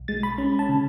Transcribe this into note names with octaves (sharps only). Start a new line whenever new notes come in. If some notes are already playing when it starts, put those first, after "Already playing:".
Already playing: B1
G#3 A6
B5
C#4 B5
A5
C#3